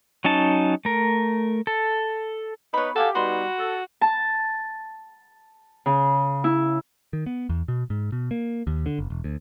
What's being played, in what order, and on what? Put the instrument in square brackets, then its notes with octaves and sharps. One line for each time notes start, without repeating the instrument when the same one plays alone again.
[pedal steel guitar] F#3 C#4 D#4 A5
A3 A#4
A4
[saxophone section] B3 D#4 B4 [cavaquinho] C#5 B5
[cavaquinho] F#4 F5 G#5 [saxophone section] G4 [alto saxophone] A4
[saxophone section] G3 B3 D#4 [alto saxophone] F#4 [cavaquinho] B5 C6
[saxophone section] A4
[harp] A5
C#3
E4
[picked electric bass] D#3
B3
E2
B2
G#2
B2
A#3
D#2
D3
F#1
E1
D2